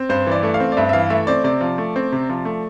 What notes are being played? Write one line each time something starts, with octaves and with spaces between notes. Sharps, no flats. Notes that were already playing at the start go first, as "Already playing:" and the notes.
Already playing: C4
G2 C5
E3 D5
A3
F5
C4
D5
G2 E5
E5
E3 F5
A3 E5
C4 D5
C3 D5
F3
A3
C4
C3
F3
A3